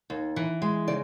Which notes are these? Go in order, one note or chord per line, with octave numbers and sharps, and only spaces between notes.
D#2
E3
G#3
C#3 D5